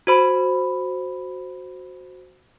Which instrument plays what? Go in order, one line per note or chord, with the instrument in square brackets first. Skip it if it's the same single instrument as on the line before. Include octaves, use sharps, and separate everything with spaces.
[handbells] F#4 C5 B5